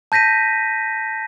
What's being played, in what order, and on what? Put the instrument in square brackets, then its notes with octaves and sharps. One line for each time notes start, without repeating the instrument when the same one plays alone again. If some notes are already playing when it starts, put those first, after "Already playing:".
[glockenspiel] A5 G6 A#6 B6 D#7